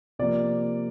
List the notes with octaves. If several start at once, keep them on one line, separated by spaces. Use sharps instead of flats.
C3 F3 A#3 D5